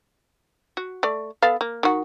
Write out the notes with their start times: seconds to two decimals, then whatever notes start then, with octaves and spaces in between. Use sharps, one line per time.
0.77 F#4
1.03 A3 D5
1.42 B3 A4 F5
1.61 A#3
1.83 D#3 F#4